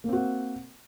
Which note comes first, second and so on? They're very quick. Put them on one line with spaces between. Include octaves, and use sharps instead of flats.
A#3 C4 F#4